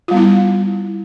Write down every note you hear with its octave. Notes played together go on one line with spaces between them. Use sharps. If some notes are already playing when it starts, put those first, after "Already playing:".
G3 B3 E4 F4